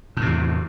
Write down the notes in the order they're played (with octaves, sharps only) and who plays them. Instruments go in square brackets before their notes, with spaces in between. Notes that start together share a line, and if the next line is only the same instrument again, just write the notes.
[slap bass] A2
C3
E2